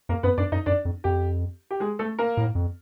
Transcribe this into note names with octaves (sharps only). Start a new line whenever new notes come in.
F2 A#3 A#4
F#2 B3 B4
F#2 D4 D5
F#2 D#4 D#5
F#2 D4 D5
F2
F2 G4
G4
G#3 G#4
A3 A4
A#3 A#4
A2
F2